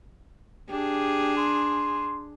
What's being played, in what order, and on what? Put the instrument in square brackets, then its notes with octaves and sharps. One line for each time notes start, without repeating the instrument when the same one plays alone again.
[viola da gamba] D4 G#4 [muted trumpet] G4
[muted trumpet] C6